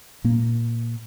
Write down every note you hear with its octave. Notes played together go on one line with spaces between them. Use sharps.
A#2 A#3